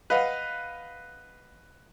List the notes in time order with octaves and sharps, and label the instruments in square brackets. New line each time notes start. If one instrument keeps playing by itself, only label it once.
[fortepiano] B4 D#5 F5 F#5